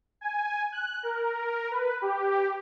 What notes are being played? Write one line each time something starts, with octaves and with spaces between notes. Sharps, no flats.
G#5
F#6
A#4
B4
G4